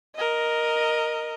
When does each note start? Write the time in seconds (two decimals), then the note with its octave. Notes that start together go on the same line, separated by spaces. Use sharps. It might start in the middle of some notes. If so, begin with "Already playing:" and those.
0.15 A#4 D#5